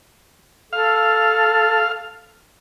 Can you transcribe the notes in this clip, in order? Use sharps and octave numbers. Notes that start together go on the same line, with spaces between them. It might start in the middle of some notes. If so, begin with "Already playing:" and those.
A4 F5